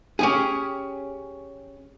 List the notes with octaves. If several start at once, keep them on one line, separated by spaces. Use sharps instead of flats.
C#4 G4 G#4